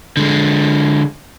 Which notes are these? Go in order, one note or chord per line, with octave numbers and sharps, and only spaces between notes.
D3 G#3